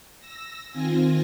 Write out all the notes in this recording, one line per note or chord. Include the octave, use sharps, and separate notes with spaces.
E6 A#6
D#3 C4 F4 G#5 A#6